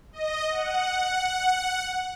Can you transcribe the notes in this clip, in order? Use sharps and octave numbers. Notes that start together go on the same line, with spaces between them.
D#5
F#5